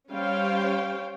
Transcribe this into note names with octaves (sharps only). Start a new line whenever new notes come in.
G3 C#4 C5 C#5 F5 G5